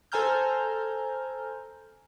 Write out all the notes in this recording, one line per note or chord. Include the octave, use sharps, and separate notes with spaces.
A4 C5 G#5 A#5 F6 G6